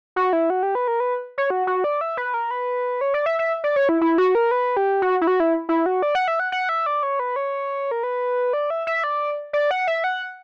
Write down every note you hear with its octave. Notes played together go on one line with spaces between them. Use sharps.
F#4
E4
F#4
G4
B4
A#4
B4
C#5
F#4
F#4
D5
E5
B4
A#4
B4
C#5
D5
E5
E5
D5
C#5
E4
E4
F#4
A#4
B4
G4
F#4
E4
F#4
E4
E4
F#4
D5
F#5
E5
F#5
F#5
E5
D5
C#5
B4
C#5
A#4
B4
D5
E5
E5
D5
D5
F#5
E5
F#5